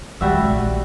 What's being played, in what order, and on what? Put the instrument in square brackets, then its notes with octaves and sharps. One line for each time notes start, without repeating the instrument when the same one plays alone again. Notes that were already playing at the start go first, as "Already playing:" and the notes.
[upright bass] D#3 G#3 [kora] G3 F#4 E5
[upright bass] A#1